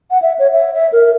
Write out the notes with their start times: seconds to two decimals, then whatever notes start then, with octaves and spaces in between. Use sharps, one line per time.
0.11 F#5
0.22 E5
0.39 C#5
0.53 E5
0.74 E5
0.92 A#4